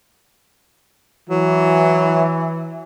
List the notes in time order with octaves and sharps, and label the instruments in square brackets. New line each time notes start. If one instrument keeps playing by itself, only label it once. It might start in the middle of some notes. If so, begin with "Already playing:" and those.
[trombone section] E3 [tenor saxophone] F#3